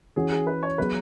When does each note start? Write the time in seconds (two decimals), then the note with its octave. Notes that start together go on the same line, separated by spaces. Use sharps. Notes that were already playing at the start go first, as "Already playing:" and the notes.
0.16 E3 C#4 F#4 G#4
0.31 G#4
0.47 B4
0.63 C#5
0.78 F#3 B3 G#4 B4